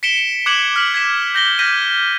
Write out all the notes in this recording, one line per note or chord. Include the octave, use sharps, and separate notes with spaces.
B6 C#7 D7 E7 G7
D6 F#6 G#6 C#7 E7 F#7
F6 B6 F#7
G#6 B6 E7
G6 A#6 G7
F6 G6 G#6 A#6 B6 D#7